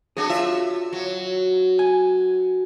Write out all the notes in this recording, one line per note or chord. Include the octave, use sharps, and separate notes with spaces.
F#3 D4 G#4
F4 E5
F#3
G#5